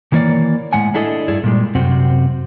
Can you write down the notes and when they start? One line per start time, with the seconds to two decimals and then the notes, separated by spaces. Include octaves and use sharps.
0.12 D#3 E3 A#3 C#5 D5
0.73 A2 G#3 F#5 G#5
0.94 D4 E4 G#4 A4 D5 D#5
1.28 G2 E4 G#4 D5
1.44 A#2 G3 G#3
1.75 F#2 C3 C4 F#4